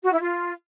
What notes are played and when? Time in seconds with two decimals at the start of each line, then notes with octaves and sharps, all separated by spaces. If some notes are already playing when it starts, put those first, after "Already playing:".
0.03 F#4
0.12 E4
0.21 F4